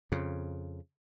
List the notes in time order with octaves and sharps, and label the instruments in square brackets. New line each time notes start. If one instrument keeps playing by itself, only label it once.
[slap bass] F2 C#3